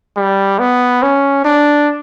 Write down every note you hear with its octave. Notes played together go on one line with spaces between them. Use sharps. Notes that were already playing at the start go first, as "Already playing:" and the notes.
G3
B3
C#4
D4